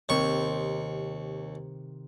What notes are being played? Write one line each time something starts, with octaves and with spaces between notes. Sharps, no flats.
D#2 C3 D#3 C4 C#6